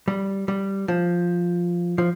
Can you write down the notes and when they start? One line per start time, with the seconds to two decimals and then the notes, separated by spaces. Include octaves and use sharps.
0.08 G3
0.48 G3
0.88 F3
1.98 F3